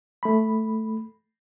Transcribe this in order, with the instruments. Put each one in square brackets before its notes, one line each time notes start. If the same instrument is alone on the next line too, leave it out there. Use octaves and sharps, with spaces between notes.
[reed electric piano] A3 B5